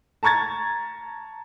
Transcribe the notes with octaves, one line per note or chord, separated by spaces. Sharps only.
A5 A#5 C#6 G#6 A6